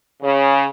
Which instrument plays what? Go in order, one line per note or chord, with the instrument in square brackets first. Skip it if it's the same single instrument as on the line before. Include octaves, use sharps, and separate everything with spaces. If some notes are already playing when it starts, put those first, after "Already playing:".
[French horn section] C#3